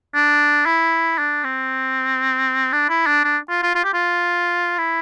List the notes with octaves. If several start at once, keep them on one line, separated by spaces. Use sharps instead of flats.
D4
E4
D4
C4
D4
E4
D4
D4
F4
F4
F4
G4
F4
E4